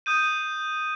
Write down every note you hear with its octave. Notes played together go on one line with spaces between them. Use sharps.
D#6 G6 D#7